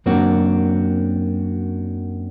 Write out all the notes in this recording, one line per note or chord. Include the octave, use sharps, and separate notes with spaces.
F#2 F#3 A#3 C4 D4 F#4